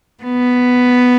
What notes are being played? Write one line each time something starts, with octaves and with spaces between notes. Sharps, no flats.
B3